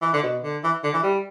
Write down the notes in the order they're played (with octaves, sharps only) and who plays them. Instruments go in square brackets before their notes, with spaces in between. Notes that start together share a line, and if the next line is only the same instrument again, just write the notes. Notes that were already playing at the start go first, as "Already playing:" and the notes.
[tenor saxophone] E3
D3
B2
D3
E3
D3
E3
G3